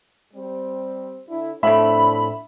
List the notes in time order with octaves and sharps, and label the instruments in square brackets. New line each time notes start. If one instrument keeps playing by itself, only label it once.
[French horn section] G3 C4
D3 E4
[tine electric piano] A2 A3 [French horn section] F3 C4 D4 [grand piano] E5 [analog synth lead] B5